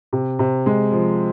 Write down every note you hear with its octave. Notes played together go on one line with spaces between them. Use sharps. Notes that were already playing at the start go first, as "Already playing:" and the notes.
C3
C3
G#3
F3